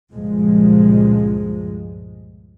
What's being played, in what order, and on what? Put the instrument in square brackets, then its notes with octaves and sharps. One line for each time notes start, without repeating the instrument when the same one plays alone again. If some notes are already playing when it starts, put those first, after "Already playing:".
[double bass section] C#2 G2 A#2 F3 G#3